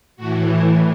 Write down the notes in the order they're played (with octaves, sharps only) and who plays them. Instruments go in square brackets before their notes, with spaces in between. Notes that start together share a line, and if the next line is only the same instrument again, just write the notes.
[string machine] A2 E3 F#4
E4